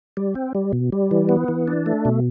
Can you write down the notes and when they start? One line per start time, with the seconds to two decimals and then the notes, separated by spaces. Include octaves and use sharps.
0.17 G3
0.35 C4
0.55 G3
0.73 B2
0.92 G3
1.11 E3
1.29 B3
1.48 E3
1.68 D4
1.86 A3
2.05 B2